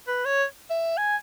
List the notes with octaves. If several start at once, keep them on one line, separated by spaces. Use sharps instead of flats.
B4
C#5
E5
G#5